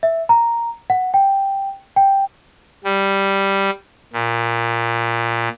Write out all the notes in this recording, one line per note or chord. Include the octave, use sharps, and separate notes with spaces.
E5
A#5
F#5
G5
G5
G3
A#2